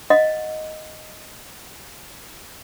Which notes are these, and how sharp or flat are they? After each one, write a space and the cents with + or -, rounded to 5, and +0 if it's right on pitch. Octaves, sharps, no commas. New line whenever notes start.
D#5 +0 F#5 -25